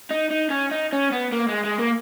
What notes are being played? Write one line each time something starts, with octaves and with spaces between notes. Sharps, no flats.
D#4
D#4
C#4
D#4
C#4
B3
A#3
G#3
G#3
A#3